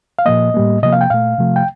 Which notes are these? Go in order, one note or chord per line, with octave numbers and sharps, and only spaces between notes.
F5
A#2 F3 A#3 D#5
A2 G3 A#3
C3 F3 A#3 D#5
F5
G5
A#2 A3 F5
C3 F3 A3
G5